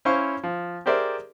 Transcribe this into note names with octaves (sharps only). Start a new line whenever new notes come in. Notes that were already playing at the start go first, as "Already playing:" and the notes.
C#4 E4 C5 F5 C#6
F3
G4 G#4 A#4 C5 D5 E5